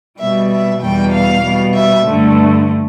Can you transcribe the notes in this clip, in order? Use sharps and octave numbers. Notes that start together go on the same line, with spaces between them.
B2 G3 E5
E5
E2 B2 G3 G5
F5
B2 G3
E5
G2 D3 A3